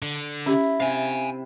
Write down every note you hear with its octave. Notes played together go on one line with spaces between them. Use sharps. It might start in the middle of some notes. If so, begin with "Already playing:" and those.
D3
C#4 E4 G4
C3 F5 G#5